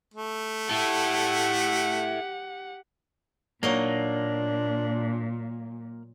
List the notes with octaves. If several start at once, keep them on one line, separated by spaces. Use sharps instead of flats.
A3
E4 G4 A4 F#5
A#2 F#3 A#3 D4 D#4 D#5